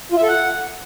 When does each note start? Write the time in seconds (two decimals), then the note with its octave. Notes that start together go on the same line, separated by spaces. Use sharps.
0.12 F4
0.17 E5
0.23 A4
0.28 F#5